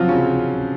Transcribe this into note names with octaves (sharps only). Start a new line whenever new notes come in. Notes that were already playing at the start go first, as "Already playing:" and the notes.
Already playing: C3 F3 F#3 C4 F4 F#4
C#3 C#4